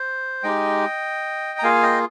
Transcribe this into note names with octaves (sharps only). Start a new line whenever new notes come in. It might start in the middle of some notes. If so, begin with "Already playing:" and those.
Already playing: C5
G#3 D#4 G4 D#5 G5
A#5
A#3 F4 G#4 F5 G#5
D#5 G5